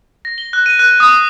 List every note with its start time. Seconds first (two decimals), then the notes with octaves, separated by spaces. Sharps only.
0.25 A#6
0.38 G7
0.53 F#6
0.66 D#7
0.79 F#6
1.00 D#6